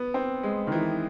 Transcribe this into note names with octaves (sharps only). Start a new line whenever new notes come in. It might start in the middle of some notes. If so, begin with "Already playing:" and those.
Already playing: B3
C4
G#3
D#3
E3